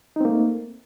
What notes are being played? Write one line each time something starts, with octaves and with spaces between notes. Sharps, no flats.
A3 A#3 C4 D#4